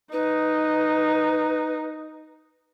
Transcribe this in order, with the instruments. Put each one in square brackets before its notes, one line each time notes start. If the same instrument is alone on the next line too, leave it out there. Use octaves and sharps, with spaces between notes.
[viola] D#4 [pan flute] B4